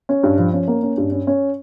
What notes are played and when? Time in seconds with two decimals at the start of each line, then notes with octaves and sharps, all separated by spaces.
0.09 C#4
0.23 G2
0.38 F3
0.53 C#4
0.68 A#3
0.83 C#4
0.98 G2
1.12 C#4
1.27 C#4